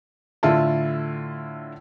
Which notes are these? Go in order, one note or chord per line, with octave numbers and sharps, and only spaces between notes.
A2 D3 E4 F4 A5